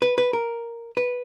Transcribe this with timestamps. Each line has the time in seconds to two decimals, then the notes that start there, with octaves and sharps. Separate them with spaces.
0.02 B4
0.18 B4
0.33 A#4
0.97 B4